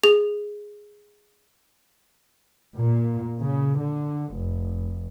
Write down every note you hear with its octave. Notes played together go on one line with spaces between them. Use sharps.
G#4 F7
A#2
C#3
D3
F1